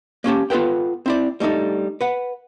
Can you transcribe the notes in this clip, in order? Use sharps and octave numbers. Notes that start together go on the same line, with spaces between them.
A#3 C#4 G4 A5
B3 F4 A4 B4 G5
C4 E4 D5
G3 A3 D4 D#4 A4
B4 F#5